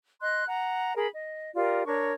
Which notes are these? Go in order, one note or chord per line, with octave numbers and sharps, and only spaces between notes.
D#5 C6 F#6
F#5 A#5
G#4 A#4 B5
D#5
F4 G4 A#4 D5
D4 A#4 C#5 C#6